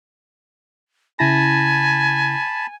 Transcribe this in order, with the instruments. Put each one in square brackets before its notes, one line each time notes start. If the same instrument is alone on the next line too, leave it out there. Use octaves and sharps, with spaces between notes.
[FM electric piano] C#3 E4 A#6 [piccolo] G#5 [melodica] A5 B5